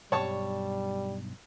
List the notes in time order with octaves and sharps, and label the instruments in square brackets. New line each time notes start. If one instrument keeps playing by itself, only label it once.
[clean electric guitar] B1 G2 [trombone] G3 [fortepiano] C#5 A5 C#6